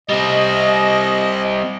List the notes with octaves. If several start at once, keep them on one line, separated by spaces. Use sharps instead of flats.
G3 C4 D#5